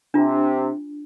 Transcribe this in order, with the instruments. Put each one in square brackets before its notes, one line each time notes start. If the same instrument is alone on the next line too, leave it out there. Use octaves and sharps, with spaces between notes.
[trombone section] C3 [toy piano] D4 F4